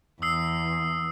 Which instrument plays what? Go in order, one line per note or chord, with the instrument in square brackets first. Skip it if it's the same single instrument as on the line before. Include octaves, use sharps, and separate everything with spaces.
[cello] E2 [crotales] D#6 E6 C7